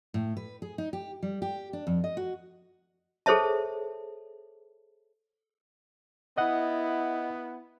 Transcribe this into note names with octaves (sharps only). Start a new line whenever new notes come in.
A2
B4
G#4
D#4
G4
G3
G4
D4
F2
D#5
F#4
G#4 A4 C5 C#5 E5 A5
B3 E4 D#5 F#5